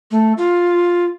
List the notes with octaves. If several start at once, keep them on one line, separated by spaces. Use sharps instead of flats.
A3
F4